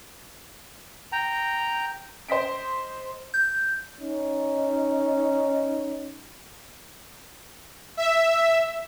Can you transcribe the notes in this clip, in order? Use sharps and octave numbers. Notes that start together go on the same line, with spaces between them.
G5 A#5
C5 D#5 B6 D7
G6
C#4 D#4
E5